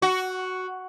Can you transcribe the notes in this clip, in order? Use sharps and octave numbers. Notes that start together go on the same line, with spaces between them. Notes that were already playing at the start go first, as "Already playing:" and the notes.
F#4